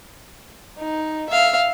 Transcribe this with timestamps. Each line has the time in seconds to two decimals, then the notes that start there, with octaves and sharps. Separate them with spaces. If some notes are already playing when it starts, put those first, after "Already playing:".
0.78 D#4
1.29 E5 F5